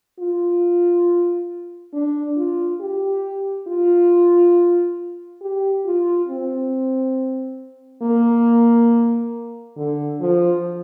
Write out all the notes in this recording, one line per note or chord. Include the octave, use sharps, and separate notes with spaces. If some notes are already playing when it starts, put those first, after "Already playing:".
F4
D4
F4
G4
F4
G4
F4
C4
A#3
D3
F3